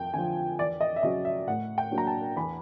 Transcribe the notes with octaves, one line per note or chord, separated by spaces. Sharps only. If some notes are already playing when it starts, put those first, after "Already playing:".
Already playing: F2 G5
D3 F3 G#5
E2 D5
D#5
E5
C#3 F#3 D#5
E5
A2 F#5
G5
F#3 A#3 D4
A#5
A5
E2 B5